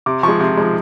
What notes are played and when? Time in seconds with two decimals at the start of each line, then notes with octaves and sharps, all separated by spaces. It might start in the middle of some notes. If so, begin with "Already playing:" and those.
0.06 C3 D6
0.23 F3 G#3 C#6
0.40 C3 C6
0.57 F3 G#3